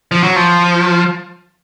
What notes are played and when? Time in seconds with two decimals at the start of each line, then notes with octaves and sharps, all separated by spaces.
0.12 F3
0.23 F#3
0.36 F3